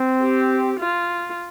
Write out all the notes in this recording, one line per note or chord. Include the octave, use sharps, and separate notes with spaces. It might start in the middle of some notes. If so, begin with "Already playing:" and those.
Already playing: C4
G4
F4